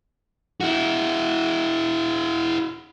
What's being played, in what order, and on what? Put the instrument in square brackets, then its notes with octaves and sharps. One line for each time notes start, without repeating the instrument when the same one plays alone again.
[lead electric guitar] E4 F#4